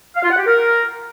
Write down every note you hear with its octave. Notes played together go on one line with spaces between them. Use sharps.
F5
F4
F#5
G4
A#4